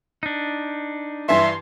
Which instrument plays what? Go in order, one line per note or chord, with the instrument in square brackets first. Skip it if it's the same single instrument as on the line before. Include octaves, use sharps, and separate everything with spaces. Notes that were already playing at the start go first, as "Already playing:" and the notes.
[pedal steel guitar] D4 D#4
[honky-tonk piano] G2 E3 [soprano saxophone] E5 [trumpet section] C6